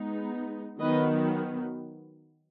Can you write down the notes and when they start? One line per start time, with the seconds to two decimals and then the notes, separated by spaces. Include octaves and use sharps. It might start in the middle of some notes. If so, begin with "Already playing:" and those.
Already playing: G#3 B3 D#4
0.80 D#3 F#3 B3 B4 D#5